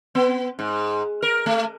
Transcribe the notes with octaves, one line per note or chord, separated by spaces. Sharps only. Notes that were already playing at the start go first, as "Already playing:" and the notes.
B3
G#2
A#4
A3